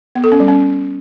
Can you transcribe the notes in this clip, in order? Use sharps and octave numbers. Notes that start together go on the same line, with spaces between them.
B3
A4
C#4
G3
C#4